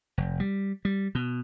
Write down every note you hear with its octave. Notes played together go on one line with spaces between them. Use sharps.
F1
G3
G3
B2